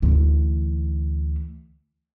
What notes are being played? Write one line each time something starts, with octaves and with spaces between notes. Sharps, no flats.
D2 E3